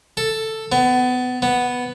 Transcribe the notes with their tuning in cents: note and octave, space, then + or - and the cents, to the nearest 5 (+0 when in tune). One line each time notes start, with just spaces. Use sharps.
A4 +5
B3 +25
B3 +0